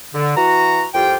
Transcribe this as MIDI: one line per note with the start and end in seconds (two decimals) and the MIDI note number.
0.14 0.34 50
0.36 0.85 52
0.36 0.85 66
0.36 0.85 82
0.94 1.16 36
0.94 1.16 41
0.94 1.16 53
0.94 1.16 65
0.94 1.16 67
0.94 1.16 79